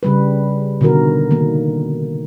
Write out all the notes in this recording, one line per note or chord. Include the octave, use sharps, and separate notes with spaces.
C#3 G3 B4
B2 D3 D#3 F#4 A#4
D#3 A#3